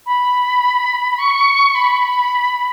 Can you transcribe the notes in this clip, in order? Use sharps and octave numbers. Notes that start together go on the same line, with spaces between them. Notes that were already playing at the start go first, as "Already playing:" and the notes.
B5
C#6
B5